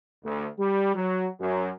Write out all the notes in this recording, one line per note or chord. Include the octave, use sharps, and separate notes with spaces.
D2
G3
F#3
F#2